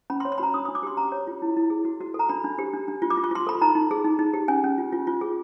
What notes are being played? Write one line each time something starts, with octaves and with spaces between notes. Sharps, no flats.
C#4 B5
C6
C#5
C6
F#4 A#5 B5
D4 D#6
D#6
D4
D6
G4 C6
C#4 A#5
C#5
F4
E4
E4
G#4
F#4
F#4
A4
A#5
D4 B5
D4
G4
D4
D4
F4
D6
F4
C#6
F4 C6
A4 B5
D#4 A#5
D#4
G#4
D#4
D#4
G4
C#4 G#5
C#4
F4
F4
F4
G#4